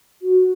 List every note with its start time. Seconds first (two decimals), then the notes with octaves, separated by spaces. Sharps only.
0.22 F#4